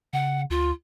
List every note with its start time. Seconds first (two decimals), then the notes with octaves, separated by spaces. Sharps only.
0.13 C#3 F#5
0.50 D2 F4